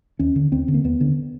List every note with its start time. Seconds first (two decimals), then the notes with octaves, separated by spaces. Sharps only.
0.19 D#2 C#4
0.36 D3
0.52 D#2 C4
0.68 D3
0.74 A#3
0.84 D#2 B3
1.01 D3